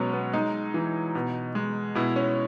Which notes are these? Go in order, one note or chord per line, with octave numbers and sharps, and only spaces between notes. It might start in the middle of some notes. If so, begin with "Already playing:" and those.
Already playing: B2 F#3 G#3 B3 C#4
B3
G#3 D#4
E3
B2
G#3
B2 E4
C#4